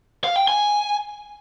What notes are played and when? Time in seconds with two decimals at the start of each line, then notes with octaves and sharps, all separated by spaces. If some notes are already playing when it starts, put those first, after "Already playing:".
0.24 F5
0.36 G5
0.48 G#5